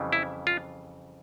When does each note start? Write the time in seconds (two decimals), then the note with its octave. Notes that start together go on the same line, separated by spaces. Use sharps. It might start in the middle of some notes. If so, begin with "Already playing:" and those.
Already playing: F2 C#3 E3 G3
0.13 E4
0.47 F4